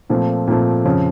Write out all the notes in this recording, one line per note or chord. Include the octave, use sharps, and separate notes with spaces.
A#2 F3 A3 C4
A#2 F3 A3 C4
F2 C#3 F3